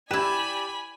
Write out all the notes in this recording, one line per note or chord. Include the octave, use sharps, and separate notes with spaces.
E4 G4 B4 D5 G#5 B5 E7